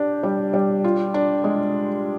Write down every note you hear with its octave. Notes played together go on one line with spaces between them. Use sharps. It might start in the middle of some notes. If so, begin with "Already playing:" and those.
Already playing: D4 G4
G3
G3
F4
D4
G#3